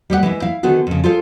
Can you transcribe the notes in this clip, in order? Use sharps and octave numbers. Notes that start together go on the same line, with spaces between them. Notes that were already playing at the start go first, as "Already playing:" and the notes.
G3 G4 C#5 F#5
E3 G#3 E4
E4 F5
D3 D#3 B3 F#4 G#4
F2 C#3
F4 G#4 A4 C5 F5